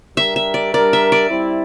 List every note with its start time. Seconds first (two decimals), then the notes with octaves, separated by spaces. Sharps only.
0.17 G3 D4 G4 A#4 E5
0.36 E5
0.54 D5
0.73 G3 D4 G4 A#4 D5
0.93 E5
1.12 D5
1.30 G3 C4 E4